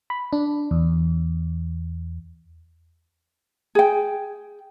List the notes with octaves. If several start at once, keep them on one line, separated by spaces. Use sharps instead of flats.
B5
D4
E2
G#4 G5